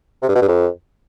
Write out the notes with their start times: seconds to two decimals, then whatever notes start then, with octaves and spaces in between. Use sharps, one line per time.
0.22 C3
0.29 G2
0.35 B2
0.42 G2
0.48 F2